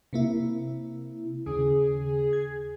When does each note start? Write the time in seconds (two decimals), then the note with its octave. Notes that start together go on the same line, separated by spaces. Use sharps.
0.13 C3 A#3 E4
1.46 D#2 C#3 G#4
2.33 G#6